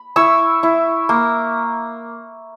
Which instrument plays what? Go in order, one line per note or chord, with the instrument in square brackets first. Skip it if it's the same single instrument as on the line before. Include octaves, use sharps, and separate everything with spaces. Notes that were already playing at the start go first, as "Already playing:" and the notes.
Already playing: [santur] B5
E4 C#6 E6
E4
A#3